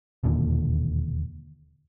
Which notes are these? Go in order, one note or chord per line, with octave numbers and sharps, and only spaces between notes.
E1 D#2 A#2 D3